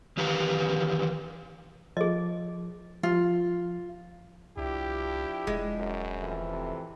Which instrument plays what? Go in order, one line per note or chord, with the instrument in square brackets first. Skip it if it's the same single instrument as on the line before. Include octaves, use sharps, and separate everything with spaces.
[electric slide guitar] D#3 E3 G4 B4 F5 A#5
[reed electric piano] F3 [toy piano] G#4 D#5
[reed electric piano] F3 [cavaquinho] F4
[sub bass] C2 [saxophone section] F3 D4 E4 [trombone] G4
[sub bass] E1 [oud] G#3
[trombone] F#2
[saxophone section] F2 A2 E3
[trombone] C3